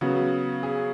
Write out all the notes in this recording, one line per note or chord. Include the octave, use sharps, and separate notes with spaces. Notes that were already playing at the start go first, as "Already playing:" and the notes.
C#3 F#3 B3 F#4
G#4